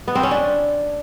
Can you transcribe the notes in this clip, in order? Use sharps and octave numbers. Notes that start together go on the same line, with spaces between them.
B3
C4
C#4
D4